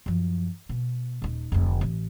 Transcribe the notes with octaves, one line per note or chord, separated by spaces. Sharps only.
F#2 F3
B2
D#1 D#4
F1 D2
A1